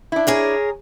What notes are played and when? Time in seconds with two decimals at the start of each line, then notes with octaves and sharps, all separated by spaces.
0.12 D4 E4
0.27 G#4 A#4 C#5